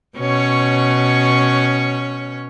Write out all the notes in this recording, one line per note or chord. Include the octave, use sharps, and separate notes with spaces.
B2 C#4 C#5